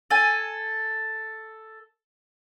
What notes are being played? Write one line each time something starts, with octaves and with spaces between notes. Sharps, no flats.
A4 G#5